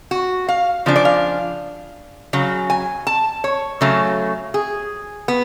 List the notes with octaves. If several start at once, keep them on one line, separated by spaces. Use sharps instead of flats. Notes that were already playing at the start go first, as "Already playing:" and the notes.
F#4
F5
C#3 F3 D4
D5
F5
C#3 F#3
G#5
A5
C#5
C#3 F#3 A3
G#4
B3